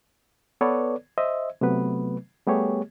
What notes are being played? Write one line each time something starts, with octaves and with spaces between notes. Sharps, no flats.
B3 A4 B4 C#5 D5
C5 D#5 E5
C3 F#3 A3 B3 B4
G3 A3 B3 G4 G#4 C#5